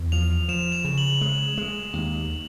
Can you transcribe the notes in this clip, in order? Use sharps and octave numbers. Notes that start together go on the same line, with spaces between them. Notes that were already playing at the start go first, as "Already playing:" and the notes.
Already playing: E2
F3 F7
F3 E7
F7
C#3
F#7
G#3
G#3
D#2